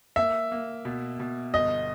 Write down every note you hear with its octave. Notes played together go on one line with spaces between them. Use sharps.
A#3 E5
A#3
B2
B2
G1 D#5